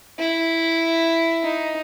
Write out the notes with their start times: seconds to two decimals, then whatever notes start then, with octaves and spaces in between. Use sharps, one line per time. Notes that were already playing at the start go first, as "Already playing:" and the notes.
0.18 E4
1.43 D#4